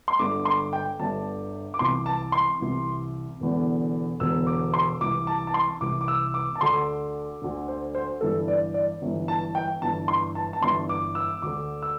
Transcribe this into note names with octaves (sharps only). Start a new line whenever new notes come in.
C6
G1 G2 D3 D6
C6
G5
G1 G2 D3 A5
D6
C2 C3 E3 C6
A5
C6
C2 C3 E3
E1 E2 D3
E1 E2 D3 E6
D6
C6
C2 C3 E3 D6
A5
A5
C6
C2 C3 E3 D6
D6
E6
D6
A5
D2 D3 C6
D2 D3
C5
C5
G1 G2 E3 A4
D5
D5
G1 G2 E3
A5
G5
G1 G2 E3 A5
C6
A5
A5
G1 G2 E3 C6
D6
E6
D2 D3 D6
E6